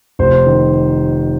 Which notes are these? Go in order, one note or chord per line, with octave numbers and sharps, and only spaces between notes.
F1 C5
D#3